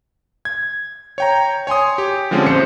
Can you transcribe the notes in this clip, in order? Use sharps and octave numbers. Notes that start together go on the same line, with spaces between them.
G#6
C#5 G5 A#5
C#5 G#5 C6 D#6
G4
D3 F3 G#3 C4 C#4
A#1 C5 C#7